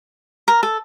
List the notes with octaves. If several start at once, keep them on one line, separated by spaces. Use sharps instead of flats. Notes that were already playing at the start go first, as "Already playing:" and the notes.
A#4
A4